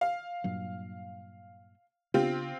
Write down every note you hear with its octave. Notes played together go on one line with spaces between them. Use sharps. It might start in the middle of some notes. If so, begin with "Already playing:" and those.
F5
G2 A#2 F#3
C#3 B3 C4 D4 F4 G4